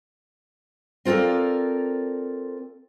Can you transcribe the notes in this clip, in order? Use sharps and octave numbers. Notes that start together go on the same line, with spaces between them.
C4 F4 A4 A#4 D5